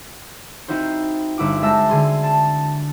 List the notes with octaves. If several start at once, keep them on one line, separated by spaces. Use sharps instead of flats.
C4 D#4 E4 F#4 C5
G1 E4 F#4 D6
G#3 C5 E5 A5 E6 A#6
D3 G#4 C6
A5